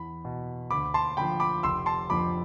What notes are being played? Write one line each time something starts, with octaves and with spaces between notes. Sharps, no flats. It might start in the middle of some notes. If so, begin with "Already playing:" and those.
Already playing: E2 B5
B2
D2 B5 D6
A5 C6
D3 F3 G5 B5
B5 D6
F1 C6 E6
A5 C6
F2 D3 F3 B5 D6